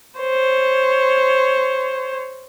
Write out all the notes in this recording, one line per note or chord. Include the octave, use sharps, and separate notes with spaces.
C5 C#5